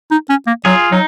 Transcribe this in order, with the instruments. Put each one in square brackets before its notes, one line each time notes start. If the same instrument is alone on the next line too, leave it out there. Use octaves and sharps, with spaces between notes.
[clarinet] D#4
C#4
A#3
[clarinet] F#3 [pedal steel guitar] F4 G#4
[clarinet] F#3 [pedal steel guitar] D#4